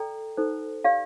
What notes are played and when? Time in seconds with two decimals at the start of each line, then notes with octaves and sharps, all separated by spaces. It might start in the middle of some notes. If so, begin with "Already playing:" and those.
Already playing: A4 D5 G5 A#5
0.37 D#4 A4 C5
0.84 G4 D5 F5